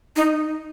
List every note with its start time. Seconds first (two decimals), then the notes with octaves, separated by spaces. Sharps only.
0.16 D#4